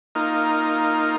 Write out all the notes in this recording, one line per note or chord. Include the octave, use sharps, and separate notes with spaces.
A#3 D#4 F4